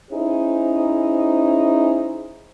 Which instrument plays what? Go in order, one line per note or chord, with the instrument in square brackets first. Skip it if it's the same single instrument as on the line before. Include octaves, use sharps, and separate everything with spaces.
[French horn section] C#4 D#4 E4 G#4 C5